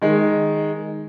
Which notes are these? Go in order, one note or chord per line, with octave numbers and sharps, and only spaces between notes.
D#3 G#3